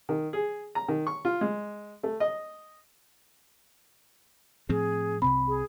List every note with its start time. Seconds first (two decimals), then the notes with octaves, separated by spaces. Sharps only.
0.09 D#3
0.33 G#4
0.75 A#5
0.88 D#3
1.07 C#6
1.25 F4
1.41 G#3
2.03 A3
2.20 D#5
4.69 A2 F3 C4 G#4
5.22 C2 C3 C4 B5
5.47 G#4